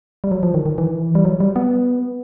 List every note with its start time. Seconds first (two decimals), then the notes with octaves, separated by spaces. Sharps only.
0.24 G3
0.31 F#3
0.43 F3
0.54 D#3
0.66 D#3
0.78 E3
1.15 G3
1.25 F#3
1.40 G3
1.56 B3